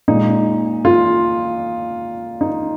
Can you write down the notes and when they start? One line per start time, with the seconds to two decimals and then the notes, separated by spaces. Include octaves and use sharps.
0.08 A#2 G#3 D#4
0.85 F4
2.41 D#4